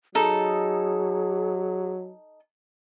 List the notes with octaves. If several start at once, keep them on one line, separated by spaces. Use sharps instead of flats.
F#3 D#4 G#4 A4